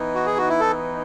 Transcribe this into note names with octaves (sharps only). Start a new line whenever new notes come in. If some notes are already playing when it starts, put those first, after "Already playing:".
Already playing: E3 B3 D#4
F#4
G#4
F#4
E4
A4